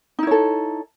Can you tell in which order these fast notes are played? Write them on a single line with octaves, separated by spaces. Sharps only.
D#4 E4 C#5 A4